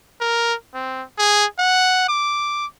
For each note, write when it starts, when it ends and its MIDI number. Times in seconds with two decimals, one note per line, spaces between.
0.21 0.54 70
0.74 1.03 60
1.19 1.45 68
1.59 2.05 78
2.09 2.67 86